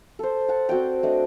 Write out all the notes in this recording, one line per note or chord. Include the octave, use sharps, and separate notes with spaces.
A4 C5
F#5 A5
C4 F#4 D5 G5
A3 D4 D#5